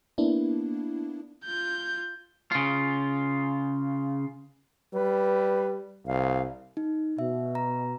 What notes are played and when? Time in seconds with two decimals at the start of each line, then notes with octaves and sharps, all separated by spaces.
0.18 A#3 B3 D4 E4
1.44 F4 G6
2.52 C#3 F4
4.94 G3 B4
6.07 C2 F5
6.77 D#4
7.19 B2 E5
7.55 A#5